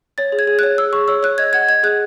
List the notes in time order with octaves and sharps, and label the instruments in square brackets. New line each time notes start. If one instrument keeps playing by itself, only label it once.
[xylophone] C#5 A6
G#4
G#6
G#4
C#5 F#6
G#4 E6
G#4 C#6
C#5 E6
C#5 F#6
D#5 G#6
F#5 G#6
D#5 G#6
G#4 F#6